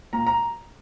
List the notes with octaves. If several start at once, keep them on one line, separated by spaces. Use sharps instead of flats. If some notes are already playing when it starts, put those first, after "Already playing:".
A#2 A#5
A#5